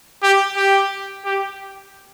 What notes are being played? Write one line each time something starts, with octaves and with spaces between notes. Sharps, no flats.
G4
G4
G4